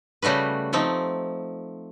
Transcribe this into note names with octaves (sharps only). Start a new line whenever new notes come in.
C#3 G3 A3 F#4 B4
F3 A3 C4 D#4